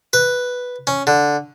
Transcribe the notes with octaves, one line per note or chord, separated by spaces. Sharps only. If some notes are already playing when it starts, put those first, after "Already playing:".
B4
C#4
D3